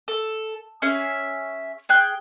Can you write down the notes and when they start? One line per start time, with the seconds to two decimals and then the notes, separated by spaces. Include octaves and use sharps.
0.08 A4
0.82 C#4 G#4 E5
1.89 G#4 G5 F#6